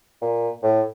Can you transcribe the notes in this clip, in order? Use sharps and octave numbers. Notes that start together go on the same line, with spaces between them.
A#2
A2